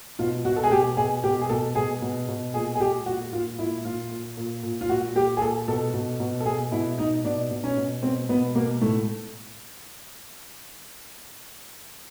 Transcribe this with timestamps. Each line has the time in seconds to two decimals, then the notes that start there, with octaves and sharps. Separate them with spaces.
0.19 B2 F4
0.45 B2 F#4
0.56 A4
0.64 G#4
0.71 B2 G4
0.97 B2 G#4
1.24 B2 G4
1.41 G#4
1.49 B2 A4
1.75 B2 G#4
2.02 B2
2.28 B2
2.54 A#2 G#4
2.75 G#4
2.80 A#2 G4
3.06 A#2 F#4
3.33 A#2 F4
3.59 A#2 E4
3.85 A#2 F4
4.11 A#2
4.37 A#2
4.63 A#2
4.81 F4
4.89 A#2 F#4
5.15 A#2 G4
5.37 G#4
5.41 A#2 A4
5.68 B2 A4
5.94 B2
6.20 B2
6.40 A4
6.46 B2 G#4
6.72 B2 E4
6.98 B2 D#4
7.24 B2 D4
7.51 B2
7.64 C#4
7.77 B2
8.03 B2 C4
8.29 B2 B3
8.55 B2 A#3
8.81 A2 A3